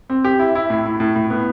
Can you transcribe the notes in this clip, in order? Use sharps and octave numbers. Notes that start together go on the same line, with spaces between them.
C4
G4
E4
E4
A2
A2
A2
A2
B3